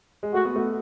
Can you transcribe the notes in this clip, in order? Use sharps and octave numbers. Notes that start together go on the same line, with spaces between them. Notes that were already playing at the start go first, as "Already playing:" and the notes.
G#3
A3 F#4
B3
A3